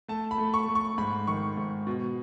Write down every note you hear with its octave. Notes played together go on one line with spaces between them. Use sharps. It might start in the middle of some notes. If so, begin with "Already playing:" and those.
A3 A5
B5
A3
C#6
A3
C#6
G#2 B5
D#3 C#6
G#2
B2